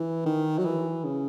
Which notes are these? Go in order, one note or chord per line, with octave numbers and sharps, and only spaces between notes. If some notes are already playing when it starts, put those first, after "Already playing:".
Already playing: E3
D#3
F#3
E3
C#3